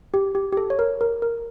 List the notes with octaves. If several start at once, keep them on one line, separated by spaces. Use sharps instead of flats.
G4
G4
G4
A4
C#5
A#4
A#4
A#4